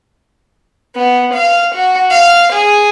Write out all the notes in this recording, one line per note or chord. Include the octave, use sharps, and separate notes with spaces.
B3
F5
F#4
F5
G#4